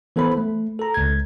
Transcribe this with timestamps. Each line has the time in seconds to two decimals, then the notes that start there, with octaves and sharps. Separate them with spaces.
0.16 E3 B3 A4 B4 C5 B5
0.37 A3
0.79 A4 A#5
0.94 C#2 G#6